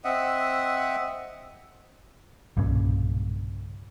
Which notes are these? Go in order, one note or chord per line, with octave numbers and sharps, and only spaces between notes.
C4 D#5 E5 F#5
B1 G2 A#2 C#3